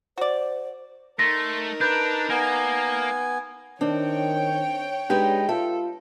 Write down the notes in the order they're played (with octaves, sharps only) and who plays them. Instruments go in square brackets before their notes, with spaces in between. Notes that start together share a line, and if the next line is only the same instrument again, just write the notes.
[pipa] F#4 D5 [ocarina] C5
[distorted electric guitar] A3 [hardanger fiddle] D#4 A#4 [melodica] C6 [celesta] A#6
[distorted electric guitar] D4 [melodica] B4 [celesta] G6
[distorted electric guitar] A#3 [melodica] B3 G#5
[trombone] D#3 [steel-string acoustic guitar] C4 [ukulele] D4 [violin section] C#5 G5
[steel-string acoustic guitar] G#3 D#4 B4 [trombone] D4 [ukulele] G4
[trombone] F4 [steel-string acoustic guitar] A4 [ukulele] E5